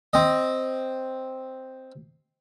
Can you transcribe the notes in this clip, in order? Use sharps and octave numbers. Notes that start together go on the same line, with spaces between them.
C4 D#5